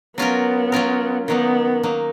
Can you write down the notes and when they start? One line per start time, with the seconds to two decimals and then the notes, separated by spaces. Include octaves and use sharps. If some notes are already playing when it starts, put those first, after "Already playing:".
0.18 F#3 B3 C#4 F4 A#4
0.72 F#3 C#4 F4 A#4
1.28 D#3 F#3 A#3 B3 D#4
1.83 D#3 F#3 A#3 D#4